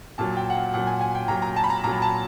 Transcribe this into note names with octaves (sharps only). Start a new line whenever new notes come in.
A#2 F#3 A5
G5
F#5
F5
A#2 F#3 F#5
G#5
G#5
G5
A#2 F#3 A#5
A#5
A5
B5
A#5
A#2 F#3 A#5
A5